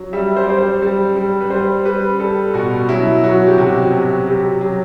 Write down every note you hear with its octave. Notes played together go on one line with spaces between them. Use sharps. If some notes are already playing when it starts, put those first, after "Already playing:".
Already playing: F#3
G3 E5
C5
D5
G3 C5
C5
G3
G3
B4
G3 C5
G3 B4
G3 A4
B2 F#4
F#3 E4
F#3 F#4
G4
C3 F#4
C3
F#3 G4
F#3